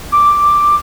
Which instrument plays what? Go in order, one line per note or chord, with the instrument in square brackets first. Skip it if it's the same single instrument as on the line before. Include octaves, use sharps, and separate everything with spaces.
[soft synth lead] D6